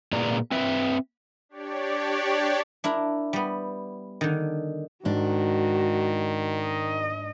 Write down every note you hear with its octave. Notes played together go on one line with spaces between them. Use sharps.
A#2 A#3 G#4 B4 D5 A#5
C4 B4 E5
D4 G4 C#5 D5
D4 E4 A#4
G3 B3
D3 D#3
G#2 D#3 D4 F#4
D#5